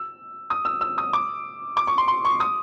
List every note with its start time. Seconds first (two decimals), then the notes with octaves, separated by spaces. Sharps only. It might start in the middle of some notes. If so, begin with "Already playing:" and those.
Already playing: E6
0.50 D#6
0.65 E6
0.81 E6
0.98 D#6
1.13 D6
1.77 D6
1.87 C#6
1.98 C6
2.08 C6
2.25 C#6
2.40 D#6